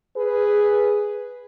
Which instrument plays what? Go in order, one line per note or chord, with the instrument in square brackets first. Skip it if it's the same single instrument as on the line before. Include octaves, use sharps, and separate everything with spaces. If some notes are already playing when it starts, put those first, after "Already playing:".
[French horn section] G#4 B4